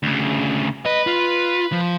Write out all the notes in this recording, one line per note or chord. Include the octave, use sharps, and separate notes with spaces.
D2 C#3
B4 D#5
F4
F3